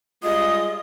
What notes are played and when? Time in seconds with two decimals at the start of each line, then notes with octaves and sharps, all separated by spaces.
0.23 G3 G#3 F4 D#5 D#6